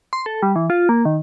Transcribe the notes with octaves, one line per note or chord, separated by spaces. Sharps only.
C6
A4
G3
E3
F4
A#3
D#3